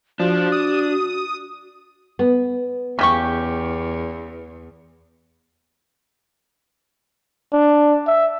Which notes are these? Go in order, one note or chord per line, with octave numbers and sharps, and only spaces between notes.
F3 D4 F#4
D#6
B3
E2 C#3 G4 C#6
D4
E5